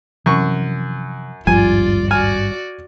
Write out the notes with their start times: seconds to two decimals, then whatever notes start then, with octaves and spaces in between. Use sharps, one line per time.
0.26 F#2 C3 E3 F3 C#6
1.47 D#1 G#1 G2 F3 F4 D5 G#5
2.11 F#4 D5 G#5 F6